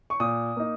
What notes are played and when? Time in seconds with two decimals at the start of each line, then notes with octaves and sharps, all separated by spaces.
0.10 C#6
0.20 A#2 D#6
0.56 A#3 D#4